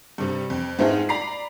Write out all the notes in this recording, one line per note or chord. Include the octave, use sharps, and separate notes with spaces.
G2 C3 G3
F2
G#2 A3 C4 D#4 F4 G#4
D5 A#5 B5 B6 C7